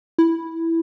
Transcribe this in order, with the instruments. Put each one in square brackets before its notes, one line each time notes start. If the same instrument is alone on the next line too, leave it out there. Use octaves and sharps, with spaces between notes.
[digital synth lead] E4